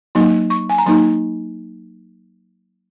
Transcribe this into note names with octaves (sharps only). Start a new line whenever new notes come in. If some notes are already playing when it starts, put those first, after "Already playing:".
F#3 A#3 D#4 C6
C#6
G#5
A#5
F#3 A#3 D#4 C6